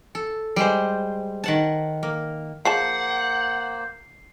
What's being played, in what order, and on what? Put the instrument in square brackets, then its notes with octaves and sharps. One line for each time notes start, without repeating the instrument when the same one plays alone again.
[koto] A4
G3 G#3 C5
D#3 F#5 A5
A#3
[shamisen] F3 G#4 A5 [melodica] A#3 C5 [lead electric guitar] F#5 [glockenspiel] C7